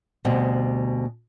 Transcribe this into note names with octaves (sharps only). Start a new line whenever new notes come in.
D2 B2 G3 C4